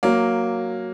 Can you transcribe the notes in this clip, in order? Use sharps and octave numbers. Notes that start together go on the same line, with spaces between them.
F#3 A#3